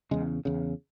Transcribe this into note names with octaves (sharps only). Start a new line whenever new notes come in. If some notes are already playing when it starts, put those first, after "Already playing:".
E2 C#3 G#3
E2 C#3